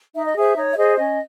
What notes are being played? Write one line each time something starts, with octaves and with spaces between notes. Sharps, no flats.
D#4 E5
D#5
G#4 C5 E5
D#4 C#5
E5
G#4 C5 D#5
C#4 D#5